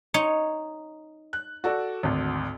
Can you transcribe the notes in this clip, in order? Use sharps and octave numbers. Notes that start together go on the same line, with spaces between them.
D#4 C#5
F#6
F#4 A4 D5
G#1 D2